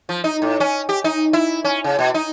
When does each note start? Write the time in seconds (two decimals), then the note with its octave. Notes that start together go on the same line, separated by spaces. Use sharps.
0.09 F3
0.24 D#4
0.42 A2
0.60 C#4
0.89 G4
1.04 D#4
1.33 E4
1.64 C#4
1.84 C#3
1.99 B2
2.14 D#4